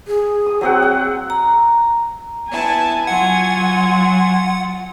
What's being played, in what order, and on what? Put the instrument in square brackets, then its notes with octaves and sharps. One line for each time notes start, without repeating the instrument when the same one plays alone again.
[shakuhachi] G#4
[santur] D#6
F#3 C4 F#5
F#5
[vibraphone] A#5
[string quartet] B3 E4 A5 [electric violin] G#5
[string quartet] F#3 F4 [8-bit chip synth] F#5